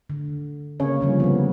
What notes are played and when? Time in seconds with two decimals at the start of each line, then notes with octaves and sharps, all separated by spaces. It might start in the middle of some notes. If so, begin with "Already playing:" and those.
0.10 D3
0.80 C#3 A#3 C#5
1.01 D3 F3 G3
1.20 D3 B3